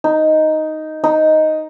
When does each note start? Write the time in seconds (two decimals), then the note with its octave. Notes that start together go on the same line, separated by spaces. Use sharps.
0.04 D#4
1.04 D#4